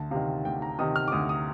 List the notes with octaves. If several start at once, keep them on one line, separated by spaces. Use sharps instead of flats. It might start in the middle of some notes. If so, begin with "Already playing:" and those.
Already playing: D2 A5
C3 D#3 F5
D2 G5
A#5
C3 D#3 D#6
F6
D6
D2 D#6
D#6